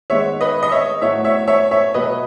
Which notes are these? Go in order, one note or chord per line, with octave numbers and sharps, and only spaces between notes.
D#3 G#3 B3 C#5 E5
B4 D#5
D#5
C#5 E5
A2 F#3 B3 C#5 E5
C#5 E5
C#5 E5
C#5 E5
B2 F#3 B3 B4 D#5